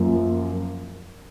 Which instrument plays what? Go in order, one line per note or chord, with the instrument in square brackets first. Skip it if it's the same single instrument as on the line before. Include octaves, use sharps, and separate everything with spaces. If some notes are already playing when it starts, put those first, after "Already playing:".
Already playing: [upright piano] F#2 F3 A#3